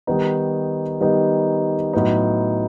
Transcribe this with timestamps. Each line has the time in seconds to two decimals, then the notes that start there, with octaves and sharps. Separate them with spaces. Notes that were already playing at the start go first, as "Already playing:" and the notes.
0.07 D#3 G3 B3 D#4
1.01 D#3 G3 B3 D#4
1.93 A2 F#3 B3 D#4